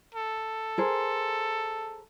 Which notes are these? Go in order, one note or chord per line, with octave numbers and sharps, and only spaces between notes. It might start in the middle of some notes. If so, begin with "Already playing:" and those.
A4
G#4 A#4 C5